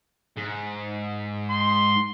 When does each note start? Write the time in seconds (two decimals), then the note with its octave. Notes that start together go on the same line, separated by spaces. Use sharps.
0.37 G#2
1.50 C6